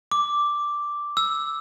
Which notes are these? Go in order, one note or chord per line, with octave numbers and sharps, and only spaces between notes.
D6
E6